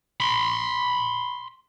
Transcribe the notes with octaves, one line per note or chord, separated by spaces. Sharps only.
B5 C6